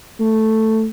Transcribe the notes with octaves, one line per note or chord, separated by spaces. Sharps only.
A3